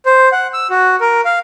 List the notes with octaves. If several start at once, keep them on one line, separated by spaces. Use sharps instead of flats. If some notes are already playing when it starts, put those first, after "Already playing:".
C5
F#5
E6
F#4
A#4
F5